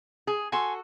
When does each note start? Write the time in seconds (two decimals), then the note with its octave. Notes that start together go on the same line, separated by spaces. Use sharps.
0.27 G#4
0.52 F#4 A4 G#5 C6